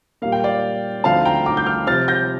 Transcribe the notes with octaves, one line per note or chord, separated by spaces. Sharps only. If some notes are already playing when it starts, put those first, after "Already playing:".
A#2 G3 A#3 F5
G5
D5 F5
D2 D3 F3 C4 D#4 F5 A5
G5 A#5
A#5 D6
G6
D6 F6
C3 F3 C4 F6 A6
G6 A#6